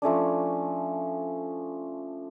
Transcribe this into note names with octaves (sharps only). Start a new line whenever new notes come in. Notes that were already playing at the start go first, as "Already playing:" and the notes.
F3 A3 C#4 D4